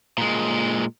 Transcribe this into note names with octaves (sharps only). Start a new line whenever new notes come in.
A#2 G#3